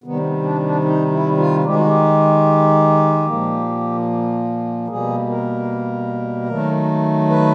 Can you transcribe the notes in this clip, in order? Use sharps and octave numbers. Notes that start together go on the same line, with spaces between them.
C3 D#3 G3 B3
D4
D4
D#4
E4
F4
D#3 G#3 G4
F#4
G4
A#2 F3 A#3
B2 G3 A#3 G#4
A#4
D#3 F#3 A3
B4